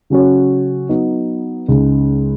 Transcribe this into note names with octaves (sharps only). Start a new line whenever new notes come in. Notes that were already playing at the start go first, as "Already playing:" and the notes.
C#3 F#3 C#4 F#4 C#5
F#3 B3 D#4
C#2 C#3 G#3 D#4